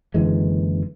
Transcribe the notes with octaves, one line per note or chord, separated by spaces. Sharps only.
F#1 D3 E3 G#3